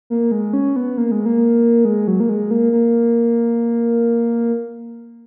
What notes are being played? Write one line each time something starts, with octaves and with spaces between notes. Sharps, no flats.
A#3
G#3
C#4
B3
A#3
G#3
A#3
G#3
F#3
A#3
G#3
A#3
A#3